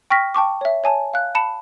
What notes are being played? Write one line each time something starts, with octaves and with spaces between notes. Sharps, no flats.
G5 C#6 F6 A#6 B6
G5 A5 C#6 D6
C#5 E5
C#5 G#5 A5
F5 F#6
A5 B5 C#7 E7